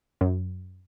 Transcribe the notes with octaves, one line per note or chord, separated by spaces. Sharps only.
F#2